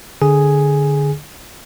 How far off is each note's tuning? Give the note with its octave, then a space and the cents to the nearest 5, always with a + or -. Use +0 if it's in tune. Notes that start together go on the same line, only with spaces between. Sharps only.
D3 +0 G#4 +0 G#5 +0